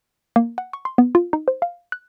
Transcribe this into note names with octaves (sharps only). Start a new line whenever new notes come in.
A#3
F#5
C#6
C6
B3
F4
D#4
C5
F5
F#6